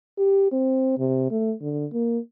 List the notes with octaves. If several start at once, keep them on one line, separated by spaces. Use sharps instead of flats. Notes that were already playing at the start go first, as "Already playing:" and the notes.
G4
C4
C3
A3
D3
A#3